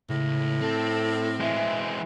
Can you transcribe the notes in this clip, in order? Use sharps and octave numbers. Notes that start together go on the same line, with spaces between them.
C#2 A2
C4 A4
E3 G#3 E5